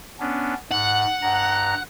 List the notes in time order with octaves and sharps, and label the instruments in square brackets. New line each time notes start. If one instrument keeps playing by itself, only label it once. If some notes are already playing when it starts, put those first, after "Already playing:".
[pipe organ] B3 C#4 D4
[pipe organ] G#2 [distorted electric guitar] F#5
[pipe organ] G2 A#5